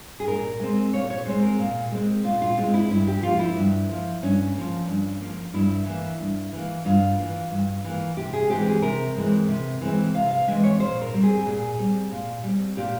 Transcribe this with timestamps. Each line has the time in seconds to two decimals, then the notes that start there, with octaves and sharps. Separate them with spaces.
0.20 G#4
0.28 A#2 A#4
0.60 G#3 C4
0.93 A#2 C#5
1.10 C#5
1.25 G#3 C4 C5
1.43 A#4
1.59 A#2
1.92 G#3 C4
2.24 A#2 F4
2.42 F4
2.57 G#3 C4 F4
2.74 E4
2.91 G2 E4
3.07 G4
3.23 F3 A#3 F4
3.39 E4
3.56 G2
3.89 F3 A#3
4.22 G2 C#4
4.55 F3 A#3
4.88 G2
5.21 F3 A#3
5.54 G2 E4
5.86 E3 A#3
6.20 G2
6.53 E3 A#3
6.85 G2 F4
7.17 E3 A#3
7.51 G2
7.84 E3 A#3
8.17 C3 G4
8.33 G#4
8.49 E3 G#3 C4 G4
8.66 G#4
8.82 C3 A#4
9.15 E3 G#3 C4
9.49 C3
9.81 E3 G#3 C4
10.14 C3 F5
10.31 F5
10.47 E3 G#3 C4 E5
10.64 C#5
10.80 A#2 C5
11.02 A#4
11.13 G3 C4
11.23 G#4
11.46 A#2 G#4
11.78 G3 C4
12.11 A#2
12.44 G3 C4
12.77 A#2 G4